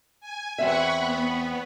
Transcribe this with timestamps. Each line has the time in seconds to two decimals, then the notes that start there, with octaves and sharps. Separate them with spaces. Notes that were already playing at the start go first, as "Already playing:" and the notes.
0.20 G#5
0.58 E2 C4 E5 F#5 B5 C#6
1.00 B3